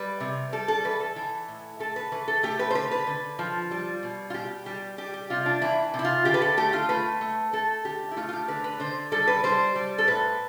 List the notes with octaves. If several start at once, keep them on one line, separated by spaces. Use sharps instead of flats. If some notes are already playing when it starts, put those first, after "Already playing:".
Already playing: G3 B4
C3
G3 A4
A4
E3 B4
A4
E3
A2
A3 A4
B4
E3 B4
A4
A3 G4
B4
C5
D3 B4
B4
D3
F3
G3
B2
F4
B2 G4
G3 G4
G3 G4
G4
C3 F4
D4
E3 E4
C3
E4
F4
D3 G4
B4
A4
A3 G4
F4
A3 B4
A3
A3 A4
D3 G4
E4
A3 F4
F4
G4
D3 B4
B4
D3 C5
G3 A4
B4
G3 C5
G3
A4
A2 B4